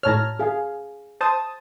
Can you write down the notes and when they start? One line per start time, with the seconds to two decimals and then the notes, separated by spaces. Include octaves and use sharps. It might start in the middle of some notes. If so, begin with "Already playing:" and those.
0.03 A2 C#5 A5 A#5 F6
0.39 G#4 F5
1.21 C5 A5 D#6